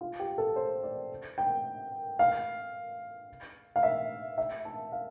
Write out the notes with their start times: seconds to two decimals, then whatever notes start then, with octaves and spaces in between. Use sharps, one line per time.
0.01 F4
0.19 G4
0.38 A4
0.56 C5
0.83 D5
1.38 G5
2.19 F5
3.76 F5
3.83 E5
4.38 E5
4.65 A5
4.92 F5